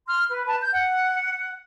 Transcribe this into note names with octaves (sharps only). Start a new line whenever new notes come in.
C6 F6
B4
B4 A5
G6
F#5